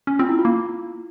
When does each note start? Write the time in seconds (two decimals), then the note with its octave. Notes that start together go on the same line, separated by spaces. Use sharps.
0.07 C#4
0.19 C4 F4
0.29 E4
0.39 F4
0.45 A#3